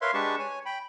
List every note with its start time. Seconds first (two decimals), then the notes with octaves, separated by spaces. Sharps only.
0.02 A#4 B4 C#5 E5 F5 C6
0.14 G#3 D4 G4 B4 A5 C#6
0.39 C#5 G#5
0.66 G5 B5